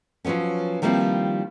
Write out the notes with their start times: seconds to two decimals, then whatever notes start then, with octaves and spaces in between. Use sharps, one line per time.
0.25 F3 F#3 A3 B3 C#4
0.82 D#3 F3 G3 A#3 C4 E4